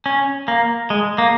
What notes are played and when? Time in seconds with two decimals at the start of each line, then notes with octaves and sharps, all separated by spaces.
0.06 C#4
0.48 A#3
0.90 G#3
1.18 A#3